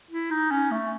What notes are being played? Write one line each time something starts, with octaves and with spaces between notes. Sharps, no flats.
E4
D#4
C#4
A3